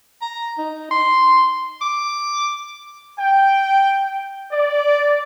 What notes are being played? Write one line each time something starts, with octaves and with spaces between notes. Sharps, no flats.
A#5
D#4
C6
D6
G5
D5